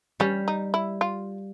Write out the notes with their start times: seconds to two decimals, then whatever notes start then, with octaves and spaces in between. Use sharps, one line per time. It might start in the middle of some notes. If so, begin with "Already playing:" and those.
0.20 G3 C#4
0.48 D#4
0.74 E4
1.01 F4